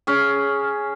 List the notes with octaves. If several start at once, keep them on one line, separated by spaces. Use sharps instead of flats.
C#4 G#4